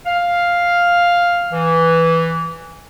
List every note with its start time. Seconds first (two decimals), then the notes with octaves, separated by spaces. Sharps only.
0.06 F5
1.52 E3